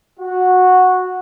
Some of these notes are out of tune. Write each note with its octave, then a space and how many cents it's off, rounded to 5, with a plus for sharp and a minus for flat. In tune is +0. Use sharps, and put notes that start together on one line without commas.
F#4 -10